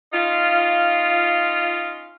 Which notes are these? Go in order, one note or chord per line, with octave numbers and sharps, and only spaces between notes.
C#4 D#4 F4